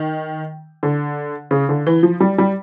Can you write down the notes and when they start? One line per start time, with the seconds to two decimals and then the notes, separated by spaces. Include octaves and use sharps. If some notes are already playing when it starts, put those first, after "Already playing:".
Already playing: D#3
0.83 D3
1.51 C#3
1.69 D3
1.87 E3
2.03 F3
2.20 G3
2.38 G3